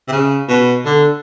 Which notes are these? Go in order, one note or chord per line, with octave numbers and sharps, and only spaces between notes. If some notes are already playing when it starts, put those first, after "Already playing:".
C3
C#3
B2
D3